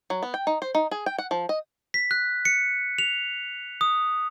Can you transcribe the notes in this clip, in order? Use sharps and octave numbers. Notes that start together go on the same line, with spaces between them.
F#3
B3
G5
D#4
C5
D#4
G#4
G5
F#5
F3
D#5
B6
F#6
C#7
F7
D#6